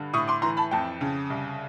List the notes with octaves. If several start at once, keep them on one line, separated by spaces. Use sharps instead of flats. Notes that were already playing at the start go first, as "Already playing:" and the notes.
Already playing: G2 D3
A2 C#6 D#6
C6 D6
E3 A#5 C6
A5 B5
F2 G5 A5
C#3
C2